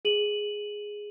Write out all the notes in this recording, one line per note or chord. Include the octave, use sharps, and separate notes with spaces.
G#4 D#7 F#7